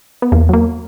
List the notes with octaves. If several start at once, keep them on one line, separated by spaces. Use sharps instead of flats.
B3
E2 A#3
F#3 A#3